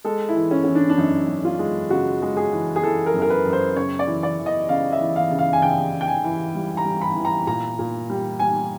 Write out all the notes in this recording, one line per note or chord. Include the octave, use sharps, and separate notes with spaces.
G#3 A4
E4
E3
C#4
E3 C#4
D4
D4
F#2 D#4
F#2
F4
G#3
C#3 F#4
G#3
G#4
E3
G#4
E3 A4
A#4
F#2
A#4
B4
F#2
C5
C#3 C#5
D5
E3
D5
E3
D#5
C#3 F5
E5
E3
F5
C#3
F5
G#5
C#3 G5
C#3
G5
G#5
E3
G3
A#5
G3
B5
E3
A#5
A#2 A#5
A#2
G3
G3 G#5